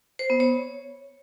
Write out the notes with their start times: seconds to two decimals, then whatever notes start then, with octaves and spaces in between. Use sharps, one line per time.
0.19 C5
0.30 B3
0.40 C#5